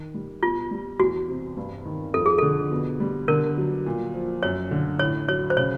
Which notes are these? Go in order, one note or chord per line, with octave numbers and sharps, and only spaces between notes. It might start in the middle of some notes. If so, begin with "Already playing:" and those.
Already playing: D#3
G3
B2 F4
G3
E2 F#4
C3
G2
D#3
F2 A4
G#4
D3 A4
B2
G3
D3 A#4
F#3
A#2
F3
F#2 C#5
D3
A2 C#5
F#3 C#5
C5
C#3 C#5